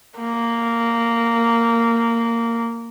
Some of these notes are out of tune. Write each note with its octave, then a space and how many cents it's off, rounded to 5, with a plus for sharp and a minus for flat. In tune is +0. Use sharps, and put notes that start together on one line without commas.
A#3 -10